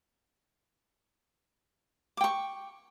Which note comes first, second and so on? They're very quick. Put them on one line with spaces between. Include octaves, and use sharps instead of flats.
D6 G5 C#6